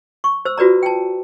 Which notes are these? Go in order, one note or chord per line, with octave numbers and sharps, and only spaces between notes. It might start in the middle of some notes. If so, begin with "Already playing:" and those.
C#6
C5 E6
F4 F#4 B4 D5 A#5
G5 A5